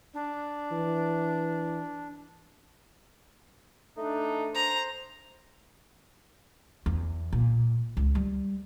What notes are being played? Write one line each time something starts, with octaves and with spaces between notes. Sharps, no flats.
D4
E3
A3 D4 D#4
C5 A#5
E2
A#2
C#2
G3